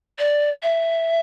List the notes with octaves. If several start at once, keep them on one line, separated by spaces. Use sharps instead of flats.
D5
E5